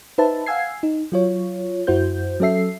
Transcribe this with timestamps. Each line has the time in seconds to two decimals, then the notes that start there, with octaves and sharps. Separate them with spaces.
0.18 D#4 B4 C5 E5 A5
0.46 F5 F#5 G#5 E6 G#6 C7
0.83 D#4
1.12 F#3 F4 C#5
1.87 F#2 E4 F#4 C5 G6
2.40 F#3 C#4 A4 E5 C7